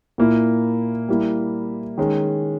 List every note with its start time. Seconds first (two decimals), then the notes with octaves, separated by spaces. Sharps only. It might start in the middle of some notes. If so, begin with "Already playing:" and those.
0.18 A#2 A#3 E4
1.09 G3 A#3 E4
1.98 D#3 G#3 C#4